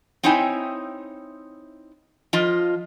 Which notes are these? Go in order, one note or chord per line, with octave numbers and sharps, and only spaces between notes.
C4 D#4 E4 C#5 G5 G#5
F3 F4 D#5